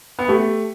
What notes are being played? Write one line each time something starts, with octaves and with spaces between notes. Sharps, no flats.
B3
A3 G4